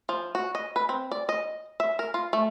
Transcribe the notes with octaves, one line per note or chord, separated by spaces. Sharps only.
F3
F#4
D#5
B4
C4
D5
D#5
E5
A#4
F4
A3